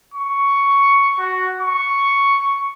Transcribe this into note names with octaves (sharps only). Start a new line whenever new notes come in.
C#6
F#4
C#6